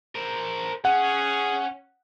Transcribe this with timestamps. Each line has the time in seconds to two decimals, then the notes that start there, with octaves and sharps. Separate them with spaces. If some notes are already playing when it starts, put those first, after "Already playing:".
0.15 A#4 C5
0.85 C#4 G#4 F#5